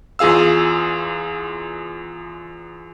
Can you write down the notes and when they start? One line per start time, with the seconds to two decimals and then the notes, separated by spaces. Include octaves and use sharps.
0.19 E2 F4 G#4 F5 E6